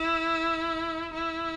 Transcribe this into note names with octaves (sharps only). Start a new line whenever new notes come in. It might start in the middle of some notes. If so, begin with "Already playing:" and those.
Already playing: E4
E4